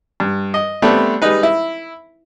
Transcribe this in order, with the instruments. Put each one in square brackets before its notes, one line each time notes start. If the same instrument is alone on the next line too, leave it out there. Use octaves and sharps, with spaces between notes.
[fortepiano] G2
D#5
G3 A3 B3 C4 D4 A4
G3 G#3 D#4 B4
E4